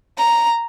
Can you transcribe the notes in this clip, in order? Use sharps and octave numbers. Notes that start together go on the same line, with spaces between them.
A#5